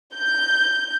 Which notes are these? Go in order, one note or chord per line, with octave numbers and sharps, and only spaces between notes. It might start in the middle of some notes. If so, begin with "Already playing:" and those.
G6